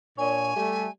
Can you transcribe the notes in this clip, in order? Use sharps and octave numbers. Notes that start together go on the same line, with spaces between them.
A#2 D4 C#5 G#5
G3 A3